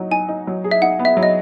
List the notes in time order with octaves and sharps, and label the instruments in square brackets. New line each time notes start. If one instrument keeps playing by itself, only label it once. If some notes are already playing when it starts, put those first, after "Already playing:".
Already playing: [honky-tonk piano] F#3 D#4
[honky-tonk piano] D#4 [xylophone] G#5
[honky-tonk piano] D#4
F#3
G#4
[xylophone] E5
[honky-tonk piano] D#4 [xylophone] F#5
[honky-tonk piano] B3
[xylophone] E5
[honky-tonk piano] F#3
[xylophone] D#5